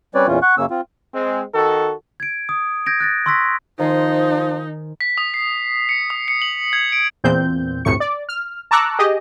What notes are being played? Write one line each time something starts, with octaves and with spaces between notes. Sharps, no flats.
G3 C4 C#4 B4 C#5 D5
E2 A#2 E3 C#4 F4
F#5 C#6 F#6
F#2 C#3 A#3 C#4 E6
C4 F4
G#3 C4
D#3 F#4 A4
G#6 D7
D#6
G6 G#6 A#6 D7
F#6 A6 A#6
C6 C#6 E6 F#6 A#6 B6
D#3 F3 D#4 C5 G#5
B6
D#6
C7
C#7
D#6
C#7
F#7
G#6
D7
E2 A#2 C4 G6
G1 D2 A2 C3 C#6 C#7
D5
F6
A5 A#5 C#6 D6 E6 F#6
G4 G#4 D#5